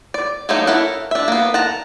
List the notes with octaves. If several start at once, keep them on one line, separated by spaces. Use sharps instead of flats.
D5
F#3 G3 A3 A#3 D#4
E4 A4 A#4 C#5 F#5
D4 E5
A#3 B3
F#5 A5 A#5